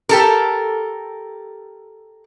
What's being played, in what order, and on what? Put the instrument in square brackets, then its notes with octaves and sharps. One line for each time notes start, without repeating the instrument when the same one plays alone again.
[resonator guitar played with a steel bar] G4 A4 A#4